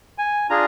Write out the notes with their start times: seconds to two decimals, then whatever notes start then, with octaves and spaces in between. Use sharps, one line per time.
0.18 G#5
0.50 D4 F4 G#4 A#5